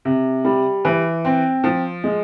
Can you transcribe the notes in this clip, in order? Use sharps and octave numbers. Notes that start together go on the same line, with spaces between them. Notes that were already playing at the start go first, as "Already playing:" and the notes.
C3
G3
E3
C4
F3
G#3